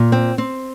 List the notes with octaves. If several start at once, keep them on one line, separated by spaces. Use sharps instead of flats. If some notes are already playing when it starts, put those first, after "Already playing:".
Already playing: A#2
C4
C4